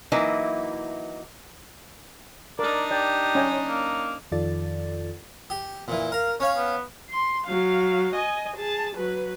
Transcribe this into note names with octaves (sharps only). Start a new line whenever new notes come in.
E3 F#3 A#3 D#4 E4 B4
D4 D#4 A#4 D5
G4 D5
C#4 D#5 G#5
A#3
F2 D#3 F4 A4 D5 A6
G4
A#2 E3
A#4 F5
C#4 C#5 F5
B3
C6
F#3 F5
D#5 G#5
G#4 A5
F#3 B4